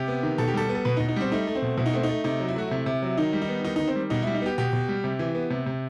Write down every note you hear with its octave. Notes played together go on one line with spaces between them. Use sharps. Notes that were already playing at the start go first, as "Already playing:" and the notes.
Already playing: C3 G4
B3
D#3
B2 A4
G4
G3 A4
B3
A4
B2 B4
D#4
B2
D#4
G3 C4
A3 D#4
A3
C4
B2
B2 E4
D#4
A3 C4
D#4
A3
C3 D#4
F#3
E4
A3 F#4
C3 E4
C3
F#3
D#3 D#4
G3
D#4
B3
D#3 D#4
D#3 D#4
C4
G3
B2 D#4
G3 E4
D#4
B3 G4
B2 G4
B2
G3
C3
E3
B3
C3
C3